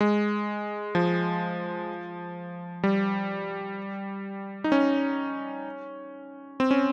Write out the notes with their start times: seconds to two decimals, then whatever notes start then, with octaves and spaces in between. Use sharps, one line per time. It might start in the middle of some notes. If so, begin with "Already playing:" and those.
0.01 G#3
0.95 F3
2.83 G3
4.64 D#4
4.72 C#4
6.60 C4
6.71 C#4